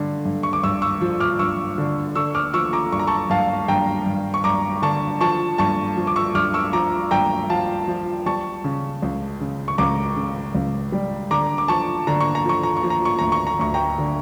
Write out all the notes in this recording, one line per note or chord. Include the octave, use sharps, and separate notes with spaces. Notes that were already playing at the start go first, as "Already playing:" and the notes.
Already playing: G2 D3
G2
C#6
D6
G2 C#6 E6
C#6 E6
F3
D6 F6
G2 C#6 E6
D3
D3 C#6 E6
D6 F6
F3 C#6 E6
A#5 D6
G2 C#6
A#5
A5 C#6
G2 F5 A5
G2 G5 A#5
G2
C#6
G2 A#5 D6
D3 A5 C#6
F3 A5 C#6
G2 A5 C#6
F3
D6
C#6 E6
G2 D6 F6
C#6 E6
F3 A#5 D6
G2 G5 A#5
F3 F5 A5
F3
G3 A5 C#6
C#3
C#2
C#3
C#6
C#2 A#5 D6
C#3
C#2
G3
D3 A#5 D6
D6
F3 A5 C#6
D3 A#5
C#6
A#5
F3 C#6
A#5
C#6
F3
A#5
C#6
D2 A#5
C#6
A#5
D2 C#6
G5 A#5
D3